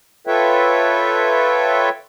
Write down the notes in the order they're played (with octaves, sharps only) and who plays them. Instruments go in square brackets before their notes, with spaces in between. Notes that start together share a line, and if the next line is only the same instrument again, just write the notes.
[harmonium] F4 A4 B4 C#5 E5 G5